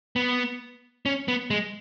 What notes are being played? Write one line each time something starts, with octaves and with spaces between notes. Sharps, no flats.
B3
C#4
B3
G#3